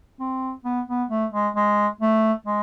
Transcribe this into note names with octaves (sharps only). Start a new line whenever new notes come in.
C4
B3
B3
A3
G#3
G#3
A3
G#3